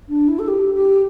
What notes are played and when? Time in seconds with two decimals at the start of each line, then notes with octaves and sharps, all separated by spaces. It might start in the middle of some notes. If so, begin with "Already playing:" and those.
0.08 D4
0.28 E4
0.38 A4
0.47 G4
0.74 G4